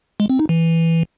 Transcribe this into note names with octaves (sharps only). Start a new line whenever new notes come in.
G#3
C4
D#4
E3